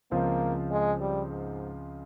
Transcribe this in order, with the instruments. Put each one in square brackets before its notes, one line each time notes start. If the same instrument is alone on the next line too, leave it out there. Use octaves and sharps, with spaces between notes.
[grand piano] C#2 C#3 F3 C4 F4 [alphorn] A#3
[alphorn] G#3
G3
G#2